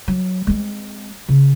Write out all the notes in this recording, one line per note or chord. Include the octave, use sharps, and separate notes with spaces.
F#3
G#3 C4
C#3